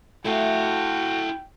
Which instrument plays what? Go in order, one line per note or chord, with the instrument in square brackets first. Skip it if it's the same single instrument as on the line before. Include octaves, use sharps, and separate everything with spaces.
[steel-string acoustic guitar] A3 A4 [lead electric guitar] E4 F5 [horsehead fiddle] F#4 [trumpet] G5